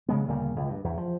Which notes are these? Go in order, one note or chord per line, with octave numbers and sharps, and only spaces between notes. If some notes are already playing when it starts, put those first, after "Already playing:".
C#3 G#3 B3
D2 A#2 C#3 G3
C#2
G2
E2
F3